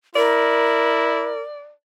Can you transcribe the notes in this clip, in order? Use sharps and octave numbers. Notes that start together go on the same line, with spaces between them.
E4 A#4 D5